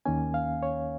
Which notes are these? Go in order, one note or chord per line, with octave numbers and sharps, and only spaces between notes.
D#2 D#3 A#3 C#4 G#5
F5
C#5